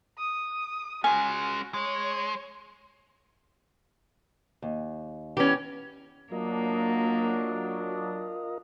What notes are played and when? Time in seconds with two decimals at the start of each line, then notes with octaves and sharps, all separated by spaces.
0.18 D#6
1.04 G#3 C#4 F#4 G#5
1.74 G#3 C#5
4.62 D#2
5.37 E3 B3 C#4 G4
6.32 F#3 A#3 D4 F4 A#4 D#5